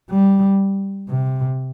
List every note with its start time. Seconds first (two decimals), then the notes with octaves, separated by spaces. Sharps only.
0.10 G3
1.09 C3